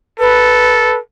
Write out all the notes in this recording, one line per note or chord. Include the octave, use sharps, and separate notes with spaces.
A4 B4